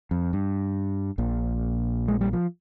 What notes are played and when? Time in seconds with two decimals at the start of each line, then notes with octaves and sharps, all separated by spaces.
0.11 F2
0.33 G2
1.18 A#1 A#2
2.08 G#3
2.21 G3
2.33 F3